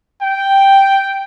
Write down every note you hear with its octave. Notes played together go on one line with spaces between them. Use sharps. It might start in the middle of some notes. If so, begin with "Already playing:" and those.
G5